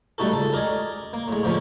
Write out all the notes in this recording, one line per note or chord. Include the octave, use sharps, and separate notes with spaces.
G3 A3 D#4 F#4 A4
C#2 A4
A#4 D5 D#5 G#5
A#3
A2 G#3
D3 F3 G#3 A#3 C#4